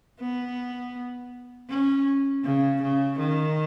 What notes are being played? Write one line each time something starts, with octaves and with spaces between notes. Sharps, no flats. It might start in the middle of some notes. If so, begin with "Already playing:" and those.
B3
C#4
C#3
C#3
D#3